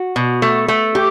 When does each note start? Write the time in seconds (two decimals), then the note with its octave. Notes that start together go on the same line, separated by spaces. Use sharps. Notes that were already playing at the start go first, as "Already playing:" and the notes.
Already playing: F#4
0.16 B2
0.42 A3
0.68 A3
0.95 G4